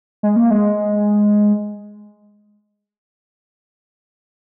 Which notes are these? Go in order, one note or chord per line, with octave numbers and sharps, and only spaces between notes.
G#3
A#3
G#3